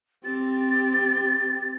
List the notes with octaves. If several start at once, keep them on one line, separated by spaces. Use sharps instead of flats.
C4 G4 A6